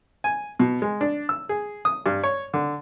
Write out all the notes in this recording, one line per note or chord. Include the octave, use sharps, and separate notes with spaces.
G#5
B2
G#3
D4
E6
G#4
D#6
G2
C#5
D3